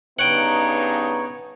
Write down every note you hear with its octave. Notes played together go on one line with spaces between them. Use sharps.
G2 C#3 B3 D#4 C#5 F#5 G5